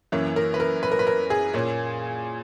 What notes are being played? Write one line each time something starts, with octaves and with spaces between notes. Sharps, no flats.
F#2 E3 A#3 C#4 C#5
A#4
B4
A#4
B4
A#4
B4
A#4
G#4
A#2 A#3 C#4